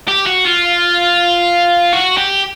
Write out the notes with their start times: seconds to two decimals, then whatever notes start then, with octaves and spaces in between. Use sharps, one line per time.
0.08 G4
0.27 F#4
0.45 F4
1.93 F#4
2.17 G4